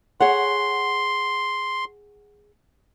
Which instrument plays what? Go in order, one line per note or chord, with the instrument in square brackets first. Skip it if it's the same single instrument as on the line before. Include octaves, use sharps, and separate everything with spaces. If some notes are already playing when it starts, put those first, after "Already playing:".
[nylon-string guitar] G#4 C#5 F#5 [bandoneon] C6